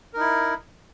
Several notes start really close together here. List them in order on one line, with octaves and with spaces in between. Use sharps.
A#4 D#4 E4